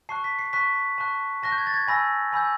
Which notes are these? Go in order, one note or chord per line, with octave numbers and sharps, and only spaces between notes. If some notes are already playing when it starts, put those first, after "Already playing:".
A5 C#6 F#6 C7
B6
C7
A5 C#6 F#6 B6
A5 C#6 F#6
A5 C#6 F#6 A#6
G6
G#6
A6
G#6
G#5 B5 E6 G6 A#6
G#5 B5 E6 G6